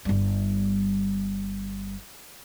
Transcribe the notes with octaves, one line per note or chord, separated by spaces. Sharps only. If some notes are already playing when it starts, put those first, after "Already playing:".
G1 G3